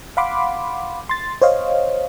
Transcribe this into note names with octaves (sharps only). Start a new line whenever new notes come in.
F5 F#5 B5 C6 D6
C6 A6
C5 C#5 D#5 F5